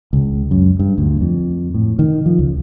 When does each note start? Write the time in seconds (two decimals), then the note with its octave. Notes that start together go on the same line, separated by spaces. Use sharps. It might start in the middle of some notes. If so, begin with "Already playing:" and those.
0.13 C#2
0.51 F#2
0.79 G2
0.98 D2
1.21 F2
1.74 A2
1.99 D#3
2.26 F3
2.39 C#2